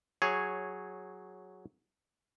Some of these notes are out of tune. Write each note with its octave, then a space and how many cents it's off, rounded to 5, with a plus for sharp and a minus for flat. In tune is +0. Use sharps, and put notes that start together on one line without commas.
F#3 +0 G#4 +0 C#5 -5